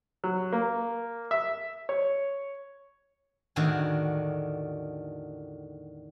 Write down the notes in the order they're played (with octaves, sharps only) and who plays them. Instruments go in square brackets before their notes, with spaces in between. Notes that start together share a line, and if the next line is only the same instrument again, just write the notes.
[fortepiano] F#3
A#3
E5
C#5
[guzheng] E2 A2 D3 D#3 F#4 G#5